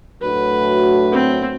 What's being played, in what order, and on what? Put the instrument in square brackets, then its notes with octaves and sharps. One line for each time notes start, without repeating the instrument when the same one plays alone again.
[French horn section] A2 F#3 A3 D4 F#4 [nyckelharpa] B4
[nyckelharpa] C4